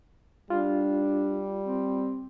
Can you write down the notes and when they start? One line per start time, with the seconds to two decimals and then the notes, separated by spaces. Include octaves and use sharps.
0.50 G3 D4 F4
1.67 C4